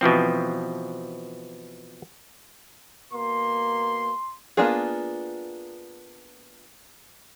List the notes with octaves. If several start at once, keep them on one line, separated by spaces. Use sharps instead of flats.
B2 E3 F3 C4
B2 A#3 C6
A#3 B3 D4 F4 G#4